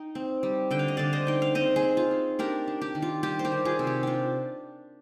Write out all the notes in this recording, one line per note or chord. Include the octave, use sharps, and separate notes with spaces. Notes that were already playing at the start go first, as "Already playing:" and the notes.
Already playing: D#4 G5
C4
G3
D3 G5
F5
D#5
D3 D5 F5
C5 D#5
D#4 G5
F5
C4 C5 D#5
G#4 C5
C4
F4
D#4
D4 G4 A#4
D4
G4
D#3
F4
G3 G4
C5
G4 A#4
D#3
F4 G#4
C3
G4
D4 F4 G4